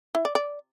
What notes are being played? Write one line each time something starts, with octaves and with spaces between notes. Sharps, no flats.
E4
D5
D5